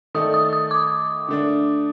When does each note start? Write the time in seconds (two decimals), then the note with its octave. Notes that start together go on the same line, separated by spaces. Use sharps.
0.14 D#3 A3 D#4 A4 D5 D#6
0.34 D#6
0.53 D#6
0.71 D6
1.28 D3 A3 D4